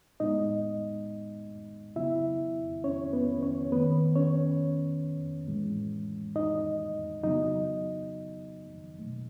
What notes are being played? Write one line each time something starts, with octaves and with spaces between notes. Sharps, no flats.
A2 G#3 B3 D#4 D#5
C#3 F#3 B3 E4 E5
C#4 C#5
B3 B4
C#4 C#5
D#3 A3 B3 B4
C#4 C#5
A2 E3 G#3
D#4 D#5
C#3 F#3 B3 D#4 D#5
B2 A3